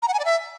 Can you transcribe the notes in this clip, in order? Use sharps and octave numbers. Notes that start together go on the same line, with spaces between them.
A#5
F#5
G#5
D5
E5